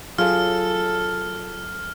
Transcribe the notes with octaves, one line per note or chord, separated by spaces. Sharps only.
F#3 F4 G#4 A4 F6